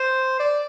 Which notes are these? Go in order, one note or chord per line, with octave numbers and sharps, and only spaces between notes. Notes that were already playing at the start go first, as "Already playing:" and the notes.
Already playing: C5
D5